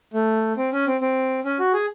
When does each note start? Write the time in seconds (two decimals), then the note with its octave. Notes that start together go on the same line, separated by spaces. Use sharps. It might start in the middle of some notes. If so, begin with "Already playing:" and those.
0.14 A3
0.57 C4
0.72 C#4
0.87 C4
1.01 C4
1.45 C#4
1.59 F#4
1.73 G#4